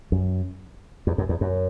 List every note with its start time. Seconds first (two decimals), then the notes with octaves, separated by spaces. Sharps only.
0.12 F#2
1.07 E2
1.18 F#2
1.29 E2
1.41 F#2